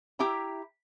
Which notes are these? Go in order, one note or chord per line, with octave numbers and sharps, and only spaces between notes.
E4 G4 E5 G5 A#5